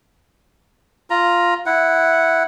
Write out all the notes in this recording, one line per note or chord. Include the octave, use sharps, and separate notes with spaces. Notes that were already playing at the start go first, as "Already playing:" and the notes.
F4 A#5
E4 F#5